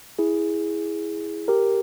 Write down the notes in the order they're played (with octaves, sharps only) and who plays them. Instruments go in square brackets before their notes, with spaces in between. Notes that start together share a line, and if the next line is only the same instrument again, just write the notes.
[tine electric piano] E4 G#4
G4 A#4